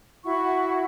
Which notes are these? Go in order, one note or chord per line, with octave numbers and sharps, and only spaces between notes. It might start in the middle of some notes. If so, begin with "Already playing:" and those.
E4 F#4 F#5 C#6